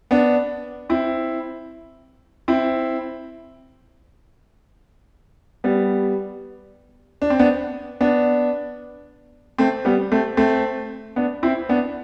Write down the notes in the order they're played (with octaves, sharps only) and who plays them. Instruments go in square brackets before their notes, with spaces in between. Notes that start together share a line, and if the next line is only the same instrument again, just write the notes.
[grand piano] B3 D4
C4 E4
C4 E4
G3 B3
D4
C4
B3 D4
B3 D4
A3 C4
G3 B3
A3 C4
A3 C4
B3 D4
C4 E4
B3 D4